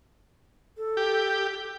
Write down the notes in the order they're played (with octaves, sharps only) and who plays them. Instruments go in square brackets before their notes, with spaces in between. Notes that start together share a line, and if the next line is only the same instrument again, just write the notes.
[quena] A4
[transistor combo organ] G4